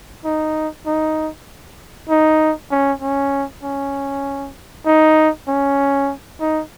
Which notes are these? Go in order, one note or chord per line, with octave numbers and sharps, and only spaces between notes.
D#4
D#4
D#4
C#4
C#4
C#4
D#4
C#4
D#4